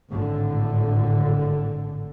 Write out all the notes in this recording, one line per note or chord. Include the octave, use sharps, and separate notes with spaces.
G#1 A2 D3